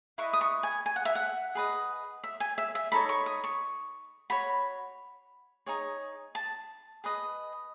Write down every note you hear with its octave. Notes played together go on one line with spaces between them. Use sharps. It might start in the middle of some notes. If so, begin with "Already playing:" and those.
E4 B4 D#5 C#6
D#6
C#6
G#5
G#5
F#5
E5
F#5
G#4 B4 D#5
E5
G#5
E5
E5
D#4 A4 C#5 B5
C#6
D#6
C#6
F#4 C#5 B5
D#4 G#4 C#5
A5
G#4 B4 D#5